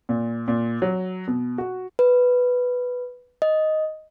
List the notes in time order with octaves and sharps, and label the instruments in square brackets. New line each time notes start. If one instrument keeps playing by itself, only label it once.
[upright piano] A#2
A#2
F#3
B2
F#4
[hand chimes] B4
D#5